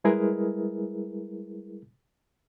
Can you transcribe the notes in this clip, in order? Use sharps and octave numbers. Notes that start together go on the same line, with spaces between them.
G3 G#3 E4 G#4 A#4 B4